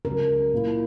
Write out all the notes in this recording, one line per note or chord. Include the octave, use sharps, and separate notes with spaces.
C#2 C#3 F#3 A#4
A#2 A#3 E4